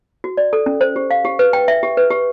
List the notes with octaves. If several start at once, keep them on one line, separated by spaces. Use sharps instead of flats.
F#4
D5
A4
C#4
C5
G4
F5
G4
B4
G5
E5
G4
B4
G4